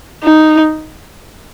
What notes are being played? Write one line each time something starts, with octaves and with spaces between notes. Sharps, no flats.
D#4